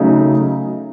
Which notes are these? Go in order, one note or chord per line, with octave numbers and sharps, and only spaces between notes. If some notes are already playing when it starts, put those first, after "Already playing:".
Already playing: C#3 F#3 A3 D#4